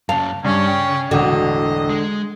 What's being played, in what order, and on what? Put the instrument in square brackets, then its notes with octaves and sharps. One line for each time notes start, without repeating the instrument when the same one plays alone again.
[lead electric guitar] F#2 C#3 [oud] F5 [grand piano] A5
[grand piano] G2 [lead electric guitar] C#3 [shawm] C#4
[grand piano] G5
[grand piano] E1 A2 [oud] D3 F#4 [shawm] D#5
[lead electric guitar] G#3